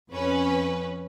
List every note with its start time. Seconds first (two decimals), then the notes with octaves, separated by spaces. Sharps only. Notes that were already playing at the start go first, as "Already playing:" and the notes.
0.11 F2 C#4 B4